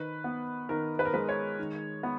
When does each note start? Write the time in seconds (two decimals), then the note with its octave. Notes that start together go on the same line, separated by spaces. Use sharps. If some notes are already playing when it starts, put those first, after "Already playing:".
Already playing: D#3 B4
0.24 B3
0.69 D#3 A#4
0.99 B4
1.05 A#4
1.14 G#3 B4
1.29 C#5
1.59 D#3
2.03 B3